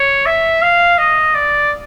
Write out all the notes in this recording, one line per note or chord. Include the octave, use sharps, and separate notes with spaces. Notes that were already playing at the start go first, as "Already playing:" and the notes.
Already playing: C#5
E5
F5
D#5
D5